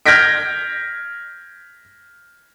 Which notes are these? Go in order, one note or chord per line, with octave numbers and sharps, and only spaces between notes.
F6 G6 G#6 A#6 B6 D7